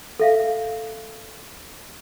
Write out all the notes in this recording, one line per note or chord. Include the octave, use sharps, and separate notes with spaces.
A4 E5 F5